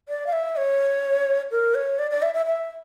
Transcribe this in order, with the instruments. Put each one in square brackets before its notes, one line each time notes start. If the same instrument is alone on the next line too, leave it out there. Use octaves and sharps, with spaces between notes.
[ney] D5
F5
E5
C#5
A#4
C#5
D5
D5
E5
E5
E5